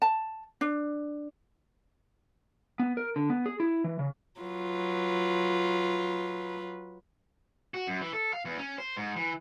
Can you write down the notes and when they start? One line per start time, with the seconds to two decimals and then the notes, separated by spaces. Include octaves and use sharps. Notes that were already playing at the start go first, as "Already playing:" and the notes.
0.02 A5
0.61 D4
2.79 B3
2.97 A#4
3.16 D3
3.30 B3
3.46 G#4
3.60 E4
3.84 E3
3.99 C#3
4.40 F#3 F4 B4
7.74 F#4
7.87 F#2
8.01 E3
8.13 A4
8.33 F5
8.45 E2
8.58 C#4
8.78 C5
8.97 G#2
9.16 E3